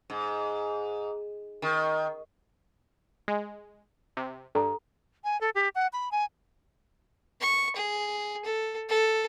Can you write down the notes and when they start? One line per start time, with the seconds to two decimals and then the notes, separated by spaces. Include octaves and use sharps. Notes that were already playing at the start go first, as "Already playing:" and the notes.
0.10 G#2
1.62 D#3
3.28 G#3
4.17 C3
4.55 G2 A4 A#5
5.24 G#5
5.41 A4
5.55 G4
5.75 F#5
5.93 B5
6.12 G#5
7.41 C#6
7.76 G#4
8.45 A4
8.89 A4